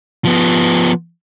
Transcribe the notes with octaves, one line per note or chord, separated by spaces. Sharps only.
F3 B3